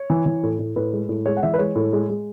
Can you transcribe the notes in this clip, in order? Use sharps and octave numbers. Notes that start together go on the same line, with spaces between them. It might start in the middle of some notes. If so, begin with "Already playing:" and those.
Already playing: C#5
E3
E3
A2
A2
A2 B4
G#3
A2
G#3 C#5
F#5
E3 E5
B4
G#3 C#5
A2
G#3
G#3